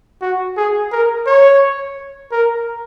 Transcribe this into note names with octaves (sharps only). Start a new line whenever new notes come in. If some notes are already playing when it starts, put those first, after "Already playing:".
F#4
G#4
A#4
C#5
A#4